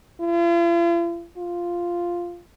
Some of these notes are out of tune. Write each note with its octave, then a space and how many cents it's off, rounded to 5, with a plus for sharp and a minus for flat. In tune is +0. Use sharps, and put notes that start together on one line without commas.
F4 -45
F4 -5